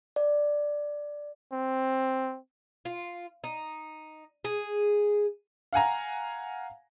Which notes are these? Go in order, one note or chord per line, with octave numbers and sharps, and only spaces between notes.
D5
C4
F4
D#4
G#4
F5 F#5 G#5 A#5